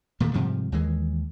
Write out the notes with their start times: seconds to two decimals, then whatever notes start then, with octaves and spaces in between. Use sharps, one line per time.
0.20 A#2 D#3 A3
0.33 G#2 C3 F3 G3
0.72 D#2 E3 G#3